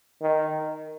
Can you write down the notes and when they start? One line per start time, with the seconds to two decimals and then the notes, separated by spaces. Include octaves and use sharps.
0.21 D#3